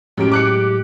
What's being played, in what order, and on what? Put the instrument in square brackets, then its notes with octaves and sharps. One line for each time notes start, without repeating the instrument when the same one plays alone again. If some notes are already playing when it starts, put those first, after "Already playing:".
[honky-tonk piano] F#2 D7 [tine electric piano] A2 F#3 G#3 [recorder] G4
[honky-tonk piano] D6 F#6 C#7